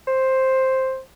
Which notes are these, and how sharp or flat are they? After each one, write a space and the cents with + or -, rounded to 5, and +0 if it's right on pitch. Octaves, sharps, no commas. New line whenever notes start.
C5 +5